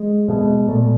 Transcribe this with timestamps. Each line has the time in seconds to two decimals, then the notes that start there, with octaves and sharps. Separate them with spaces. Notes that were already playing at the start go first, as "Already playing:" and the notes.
Already playing: G#3
0.28 B2 G#3
0.68 A#2 A3